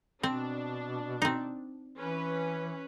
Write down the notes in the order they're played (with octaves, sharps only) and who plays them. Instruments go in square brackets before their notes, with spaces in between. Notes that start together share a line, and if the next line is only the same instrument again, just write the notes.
[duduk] B2 [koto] C4 [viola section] D4
[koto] C4 D#4
[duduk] E3 [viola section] C#4 B4